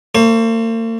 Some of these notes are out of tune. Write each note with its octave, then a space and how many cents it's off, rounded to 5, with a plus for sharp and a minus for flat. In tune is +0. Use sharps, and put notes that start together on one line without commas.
A#3 -45 C5 +25